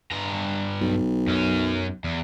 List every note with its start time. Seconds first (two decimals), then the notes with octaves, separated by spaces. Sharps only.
0.12 G2 A#5
0.81 B1
1.28 F#2 C#4
2.04 E2